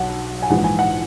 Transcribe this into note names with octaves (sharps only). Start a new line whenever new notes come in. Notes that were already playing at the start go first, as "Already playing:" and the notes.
Already playing: B1 B2 F#5
G#5
A#1 G#2 E3 F#5
G#5
F#5